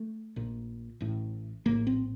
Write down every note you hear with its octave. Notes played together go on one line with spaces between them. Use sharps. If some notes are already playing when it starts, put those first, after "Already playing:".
Already playing: A3
A#1 A#2
A1 A2
A#1 A2 A#3
C4